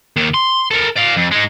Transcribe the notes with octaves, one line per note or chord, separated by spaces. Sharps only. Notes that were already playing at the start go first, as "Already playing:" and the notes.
D#2 D#3
C6
A4 A#4
D5 F5
F2
G#3 D#4